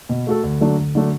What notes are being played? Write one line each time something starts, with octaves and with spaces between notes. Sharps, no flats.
B2
A3 F#4 A4
D2
D3 F#3 A3 D4
D2
D3 F#3 A3 D4